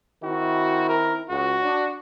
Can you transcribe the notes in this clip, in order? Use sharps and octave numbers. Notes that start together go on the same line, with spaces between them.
D#3 C4 E4 F#4
A#4
C#2 F#4
D4